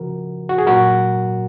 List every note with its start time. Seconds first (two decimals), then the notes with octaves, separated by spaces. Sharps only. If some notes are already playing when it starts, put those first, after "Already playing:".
Already playing: C#3 F3 F#4 A#4
0.49 F#4
0.58 G#4
0.67 A#2 F#3 F#4 A#4